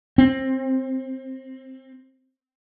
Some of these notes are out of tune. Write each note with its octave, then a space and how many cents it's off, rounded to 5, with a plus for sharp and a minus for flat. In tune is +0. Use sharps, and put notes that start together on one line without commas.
C4 +20